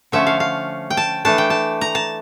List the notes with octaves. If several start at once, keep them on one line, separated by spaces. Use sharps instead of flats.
D3 F3 A3 C#4 E5
F5
F5
G5
A5
E3 A3 D4 A5
G5
A5
A#5
A5